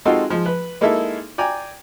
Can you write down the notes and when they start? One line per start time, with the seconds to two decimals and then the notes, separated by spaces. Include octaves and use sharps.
0.05 G#3 C4 D#4 F4 F#4 A4
0.30 F3 G#3
0.46 B4
0.81 G#3 A#3 D#4 E4 A4 E5
1.38 D5 G5 G#5 A#5